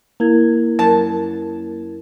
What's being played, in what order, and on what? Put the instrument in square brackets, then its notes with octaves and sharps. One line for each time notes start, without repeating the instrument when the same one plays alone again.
[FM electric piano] A#3 [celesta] E4 A#4 G#6
[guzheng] F#2 [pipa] A5